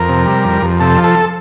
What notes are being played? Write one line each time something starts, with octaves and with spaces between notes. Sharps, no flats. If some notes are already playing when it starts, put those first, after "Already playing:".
Already playing: F2 A#4
C3
G3
F2
F2
C3 A4
F3
A4